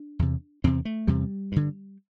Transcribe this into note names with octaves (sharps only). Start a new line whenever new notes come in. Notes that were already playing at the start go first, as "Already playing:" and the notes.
Already playing: D4
E2 C3
E2 C3 C4
A3
E2 C3 G3
G2 D3